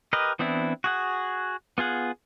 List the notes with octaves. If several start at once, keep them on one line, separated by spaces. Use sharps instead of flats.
G4 A#4 B4 D#5
E3 B3 C4 D4 E4
F#4 G#4 F#5
B3 F4 G#4 F#5